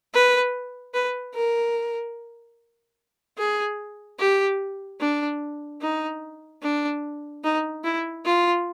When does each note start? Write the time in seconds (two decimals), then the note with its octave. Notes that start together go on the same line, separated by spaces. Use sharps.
0.14 B4
0.94 B4
1.34 A#4
3.38 G#4
4.19 G4
5.00 D4
5.81 D#4
6.62 D4
7.44 D#4
7.84 E4
8.25 F4